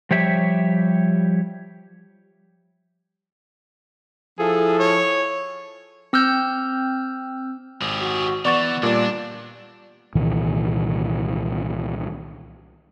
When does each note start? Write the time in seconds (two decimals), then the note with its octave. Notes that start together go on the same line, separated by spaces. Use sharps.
0.11 F3 G3 G4 C#5 E5
4.39 F3 E4 G#4 A4
4.80 C#5
6.13 C4 E6 F6 G6
7.81 G#1 G4 G#4
8.01 F#4
8.45 E3 B3 D5 C#6 A6
8.83 A#2 G3 D4 D5
10.15 C2 A#2 D#3 E3